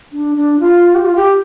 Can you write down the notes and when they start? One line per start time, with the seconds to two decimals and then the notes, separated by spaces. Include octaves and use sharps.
0.13 D4
0.36 D4
0.59 F4
0.95 G4
1.05 F4
1.16 G4